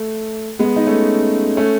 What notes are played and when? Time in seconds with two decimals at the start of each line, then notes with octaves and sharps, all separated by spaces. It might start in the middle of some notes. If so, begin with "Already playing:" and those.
Already playing: A3
0.59 G#3 B3
0.76 D#4
0.86 A3 C#4
1.57 A3 C#4